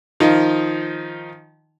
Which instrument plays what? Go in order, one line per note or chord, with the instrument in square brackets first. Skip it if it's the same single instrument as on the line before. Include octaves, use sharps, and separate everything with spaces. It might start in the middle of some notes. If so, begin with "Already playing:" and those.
[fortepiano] D#3 F3 D#4